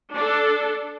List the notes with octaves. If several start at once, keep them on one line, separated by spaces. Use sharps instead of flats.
D4 A4